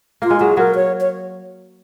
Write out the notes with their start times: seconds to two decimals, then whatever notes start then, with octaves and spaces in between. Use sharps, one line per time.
0.22 A#3 F4
0.30 G#3
0.40 F#3 G#4
0.57 F#3 A#4
0.75 C#5
1.01 C#5